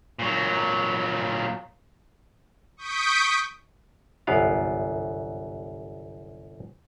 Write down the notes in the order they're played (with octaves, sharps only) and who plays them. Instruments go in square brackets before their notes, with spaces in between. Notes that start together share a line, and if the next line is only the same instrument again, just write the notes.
[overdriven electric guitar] A#2 F#3
[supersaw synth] C#6 D#6 G6 B6 D7
[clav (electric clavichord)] G1 C2 F#2 B3 F5